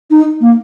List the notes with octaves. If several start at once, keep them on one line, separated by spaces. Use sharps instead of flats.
D#4
A#3